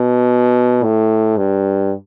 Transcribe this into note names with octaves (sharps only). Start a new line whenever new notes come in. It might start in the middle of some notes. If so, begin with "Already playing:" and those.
Already playing: B2
A2
G2